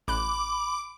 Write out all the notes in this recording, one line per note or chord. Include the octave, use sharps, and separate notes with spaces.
A1 B5 D6 F#6